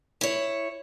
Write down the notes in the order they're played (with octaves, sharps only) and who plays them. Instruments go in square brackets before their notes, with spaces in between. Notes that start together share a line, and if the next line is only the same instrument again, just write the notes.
[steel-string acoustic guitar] E4 C#5